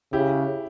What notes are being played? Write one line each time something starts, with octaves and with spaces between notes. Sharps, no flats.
C#3 E4 G4